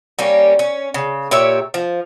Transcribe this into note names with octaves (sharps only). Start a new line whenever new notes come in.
G3 A#3 C#4 G4
C#4
C#3
A#2 G4 C#5 E5
F3